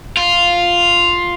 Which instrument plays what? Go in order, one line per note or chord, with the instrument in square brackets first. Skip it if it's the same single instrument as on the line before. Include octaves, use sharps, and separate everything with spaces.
[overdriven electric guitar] F4